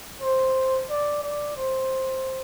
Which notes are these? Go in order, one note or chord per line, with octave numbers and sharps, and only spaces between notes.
C5
D5
D5
C5